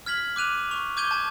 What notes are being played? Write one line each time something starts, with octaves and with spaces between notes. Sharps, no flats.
F6 G#6 B6 F#7
D6 F#6 D#7 F7
C#6 F7
D6 G6 G#6 D#7 G7
A5 G#6